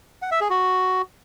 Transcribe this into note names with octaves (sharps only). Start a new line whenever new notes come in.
F#5
E5
G#4
F#4